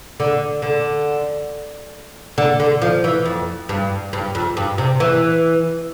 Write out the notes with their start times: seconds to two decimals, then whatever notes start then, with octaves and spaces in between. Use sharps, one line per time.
0.20 D3
0.62 D3
2.38 D3
2.60 D3
2.82 F3
3.04 E3
3.25 F2
3.69 G2
4.13 G2
4.35 F2
4.57 G2
4.78 C3
5.00 E3